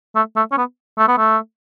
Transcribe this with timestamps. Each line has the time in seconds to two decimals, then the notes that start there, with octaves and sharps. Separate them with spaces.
0.15 A3
0.36 A3
0.51 C#4
0.57 B3
0.99 A3
1.08 B3
1.17 A3